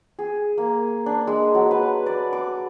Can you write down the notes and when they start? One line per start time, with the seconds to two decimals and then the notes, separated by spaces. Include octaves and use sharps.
0.19 G#4
0.58 A#3
1.06 D4
1.27 G#3
1.55 F#3
1.71 B4
2.06 D5
2.33 D6